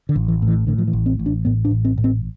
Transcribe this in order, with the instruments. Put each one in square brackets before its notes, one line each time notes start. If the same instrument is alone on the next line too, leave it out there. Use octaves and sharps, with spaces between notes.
[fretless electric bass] D3
A1
E3
A2
E3
A2 D3
F3
E3
A1
C4
A1
D4
A2 B3
D4
A1
C4
A2
C4